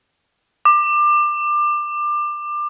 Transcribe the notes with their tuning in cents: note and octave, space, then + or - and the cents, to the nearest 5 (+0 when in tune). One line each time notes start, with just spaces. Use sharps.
D6 +25